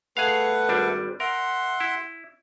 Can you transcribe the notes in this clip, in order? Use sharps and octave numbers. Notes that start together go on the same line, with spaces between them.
A3 G#4 B4 F5 F#5
G#1 G3 D4
A#4 E5 F#5 C6
E4